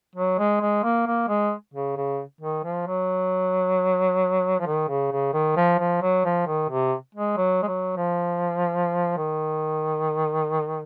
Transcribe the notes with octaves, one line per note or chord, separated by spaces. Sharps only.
F#3
G#3
G#3
A#3
A#3
G#3
C#3
C#3
D#3
F3
F#3
F3
D#3
C#3
C#3
D#3
F3
F3
F#3
F3
D#3
C3
G#3
F#3
G#3
F#3
F3
D#3